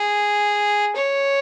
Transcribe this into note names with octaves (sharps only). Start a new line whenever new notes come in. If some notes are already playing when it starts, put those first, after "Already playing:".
Already playing: G#4
C#5